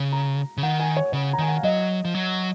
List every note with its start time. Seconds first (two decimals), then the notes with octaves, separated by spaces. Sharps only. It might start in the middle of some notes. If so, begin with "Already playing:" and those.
Already playing: C#3
0.12 A#5
0.57 C#3
0.63 D#3 F#5
0.80 G#5
0.97 C#5
1.13 C#3 C#5
1.33 A#5
1.38 D#3 G#5
1.48 F#5
1.57 F5
1.63 F#3 D#5
2.05 F3
2.15 F#3